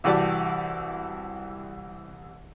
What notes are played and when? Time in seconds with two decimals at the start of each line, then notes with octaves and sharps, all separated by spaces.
0.04 C2 E3 F#4 G4 D5 A5